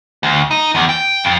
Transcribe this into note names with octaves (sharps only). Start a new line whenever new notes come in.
D2
D#4
E2
G5
F2